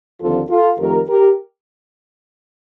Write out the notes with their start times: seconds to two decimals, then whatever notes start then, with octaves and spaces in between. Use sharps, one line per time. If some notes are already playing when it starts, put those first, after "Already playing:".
0.20 D#2 D3 F3 C4 F4 A4
0.50 F4 A4
0.79 F2 D#3 A3 G4 A#4
1.09 G4 A#4